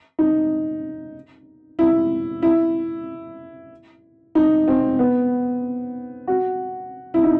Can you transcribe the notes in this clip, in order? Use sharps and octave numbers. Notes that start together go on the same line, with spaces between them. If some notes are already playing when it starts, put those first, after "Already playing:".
D#4
E4
E4
D#4
C4
B3
F#4
E4
D#4